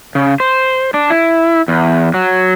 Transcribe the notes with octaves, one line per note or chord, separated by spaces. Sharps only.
C#3
C5
D4
E4
E2
F#3